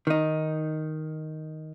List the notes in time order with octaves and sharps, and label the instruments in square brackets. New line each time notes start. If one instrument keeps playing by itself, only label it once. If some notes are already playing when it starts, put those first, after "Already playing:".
[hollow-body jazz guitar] D#3 D#4